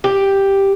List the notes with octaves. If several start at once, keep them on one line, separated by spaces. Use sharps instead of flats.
G4